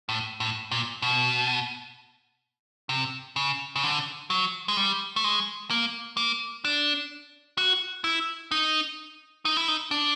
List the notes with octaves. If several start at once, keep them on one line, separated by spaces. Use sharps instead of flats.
A2
A2
A#2
B2
C3
C#3
C#3
D3
F#3
G#3
G3
A3
G#3
A#3
A#3
D4
F#4
E4
D#4
D#4
E4
D#4
D4